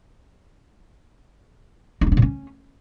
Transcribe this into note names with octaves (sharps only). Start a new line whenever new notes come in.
D#4
C#4
D4
A#2
C#4